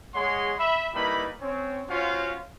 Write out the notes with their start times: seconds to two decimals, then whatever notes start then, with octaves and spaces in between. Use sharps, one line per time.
0.15 G#3 G#4 C#5 F#5 C6
0.59 E5 B5
0.94 G3 A#3 D#4 E4 B4 B5
1.41 C4 C#4 C#5
1.89 C#4 F4 F#4 C5 F5